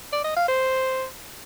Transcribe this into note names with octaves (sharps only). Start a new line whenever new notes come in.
D5
D#5
F5
C5